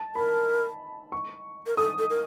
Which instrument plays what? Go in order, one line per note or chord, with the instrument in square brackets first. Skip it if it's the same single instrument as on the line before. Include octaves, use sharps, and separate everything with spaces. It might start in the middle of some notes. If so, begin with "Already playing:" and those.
Already playing: [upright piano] A5
[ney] A#4 [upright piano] B5
[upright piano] C#6
[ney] A#4
[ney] A4 [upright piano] D#6
[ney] A4
A#4